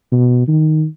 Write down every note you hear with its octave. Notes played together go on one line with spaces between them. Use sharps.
B2
D#3